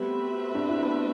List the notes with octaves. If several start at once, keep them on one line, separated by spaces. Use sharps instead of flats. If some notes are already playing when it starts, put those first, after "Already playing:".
Already playing: G3 A3 B3 C4 F#4 B4 E5
D4
E4
B3 D4